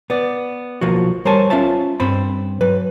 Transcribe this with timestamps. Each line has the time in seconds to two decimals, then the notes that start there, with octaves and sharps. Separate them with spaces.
0.10 B3 D5
0.81 B1 F3 A#3 F#4
1.25 G3 A#4 C5 C#5 G#5 A5
1.50 C#4 F4 E5 A5
2.00 G2 C4 C5 B5
2.61 F#3 B4